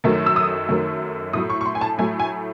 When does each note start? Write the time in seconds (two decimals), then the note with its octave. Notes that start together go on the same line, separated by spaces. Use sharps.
0.04 F#2 D#3 F#3 A3
0.26 E6
0.36 D#6
0.69 F#2 D#3 F#3 A3
1.33 A2 F#3 A3 D#6
1.50 C#6
1.61 C#6
1.66 C6
1.75 G#5
1.81 A5
1.98 A2 F#3 A3 G#5
2.20 G#5